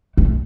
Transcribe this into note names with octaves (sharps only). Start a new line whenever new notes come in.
A3